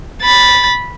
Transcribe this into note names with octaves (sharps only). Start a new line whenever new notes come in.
B5 A6